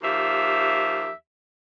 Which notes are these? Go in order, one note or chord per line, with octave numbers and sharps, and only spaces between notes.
D#2 F3 G4 E5